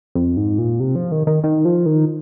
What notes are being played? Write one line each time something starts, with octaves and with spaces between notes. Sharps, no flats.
F2
G#2
A#2
C3
F3
D#3
D#3
D#3
F3
D#3